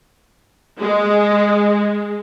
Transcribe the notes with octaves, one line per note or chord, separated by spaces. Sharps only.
G#3